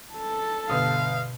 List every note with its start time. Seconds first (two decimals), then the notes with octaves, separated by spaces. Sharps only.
0.14 A4 A5
0.70 G1 B2 F5 D#6